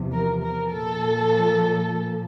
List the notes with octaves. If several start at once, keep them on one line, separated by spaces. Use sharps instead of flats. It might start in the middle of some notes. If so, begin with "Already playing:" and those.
Already playing: E2 C3 F3
A#4
A#4
A#2 F3 A4